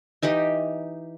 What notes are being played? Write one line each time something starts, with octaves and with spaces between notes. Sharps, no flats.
E3 D#4 G4 D#5